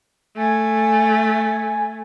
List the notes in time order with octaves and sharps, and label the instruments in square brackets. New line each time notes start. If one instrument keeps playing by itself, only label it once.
[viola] A3 [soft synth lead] G#5